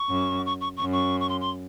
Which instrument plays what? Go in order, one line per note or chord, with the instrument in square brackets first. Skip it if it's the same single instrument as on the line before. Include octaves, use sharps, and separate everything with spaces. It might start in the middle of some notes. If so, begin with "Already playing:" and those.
Already playing: [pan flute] C#6
[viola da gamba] F#2
[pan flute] C#6
C#6
C#6
[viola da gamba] F#2
[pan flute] C#6
C#6
C6
C6